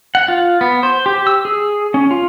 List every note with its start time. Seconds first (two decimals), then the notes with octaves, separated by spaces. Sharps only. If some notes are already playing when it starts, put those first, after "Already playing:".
0.15 F#5
0.28 F4
0.61 B3
0.83 C5
1.06 G4
1.27 E6
1.45 G#4
1.94 C#4
2.11 F4